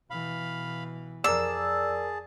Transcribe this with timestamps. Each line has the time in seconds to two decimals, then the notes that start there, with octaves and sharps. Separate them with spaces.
0.11 B2 E3 F5 B5
1.24 F2 G#4 A#4 D5 A5 E6